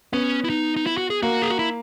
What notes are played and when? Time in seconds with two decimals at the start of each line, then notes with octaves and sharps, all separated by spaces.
0.13 B3 C#4
0.44 E4
0.50 D#4
0.76 D#4
0.87 E4
0.98 F#4
1.10 G#4
1.23 A#3 F#4
1.42 G#4
1.50 F#4
1.59 E4